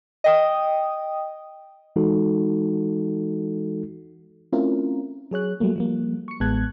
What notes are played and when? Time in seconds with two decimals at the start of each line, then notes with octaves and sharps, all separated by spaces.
0.24 D#5 G5 D#6
1.96 E3 G#3 D#4 F#4 A4
4.53 A3 C4 C#4 E4 F4 A#4
5.31 F#3 G#4 C#5 F#6
5.60 F#3 G3 A3 A#3
5.76 F3 G3 A#3
6.28 C#6 C#7
6.40 A1 G#3 B3 A5 F#6 G#6